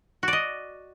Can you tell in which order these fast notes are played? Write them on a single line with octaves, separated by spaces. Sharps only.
F#4 D5 D#5